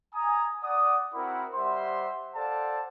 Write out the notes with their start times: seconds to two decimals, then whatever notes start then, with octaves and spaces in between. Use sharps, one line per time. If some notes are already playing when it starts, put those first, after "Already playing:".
0.14 G#5 A#5 D#6
0.63 D5 F#5 D#6
1.14 C4 E4 F#4 A#4 F#5 B5
1.54 G3 C5 E5 F#5 C6
2.35 A4 C5 D5 F5 F#5 A5